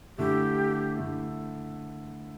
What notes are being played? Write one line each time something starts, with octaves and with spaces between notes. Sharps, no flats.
D3 A3 E4 G4
D3 A3 E4